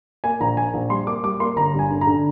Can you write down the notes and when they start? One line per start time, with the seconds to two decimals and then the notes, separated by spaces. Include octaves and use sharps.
0.24 A#3 G#5
0.41 A#1 A#5
0.57 A#3 G#5
0.74 A#1
0.90 G3 C6
1.07 A#3 D6
1.24 G3 D6
1.40 A#3 C6
1.56 G1 A#5
1.74 G2
1.79 G#5
1.90 D3
2.01 A#5
2.07 D3